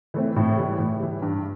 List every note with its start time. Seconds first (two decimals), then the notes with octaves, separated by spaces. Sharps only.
0.14 E3 A3 C4
0.36 A2
0.58 E3 G3
0.79 A2
1.00 E3 G3
1.22 G2